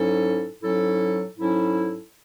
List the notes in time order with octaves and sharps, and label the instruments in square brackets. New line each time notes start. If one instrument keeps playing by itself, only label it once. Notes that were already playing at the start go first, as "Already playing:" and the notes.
Already playing: [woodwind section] G#2 F#3 C#4 E4 A4
G#2 F#3 C#4 E4 A4
G#2 F#3 C#4 E4 A4